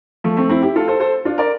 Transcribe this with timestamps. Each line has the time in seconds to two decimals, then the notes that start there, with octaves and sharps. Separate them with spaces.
0.24 F3 A3
0.37 A3 C4
0.49 C4 E4
0.62 E4 G4
0.76 F4 A4
0.88 A4 C5
1.00 A4 C5
1.25 D4 F4
1.38 A#4 D5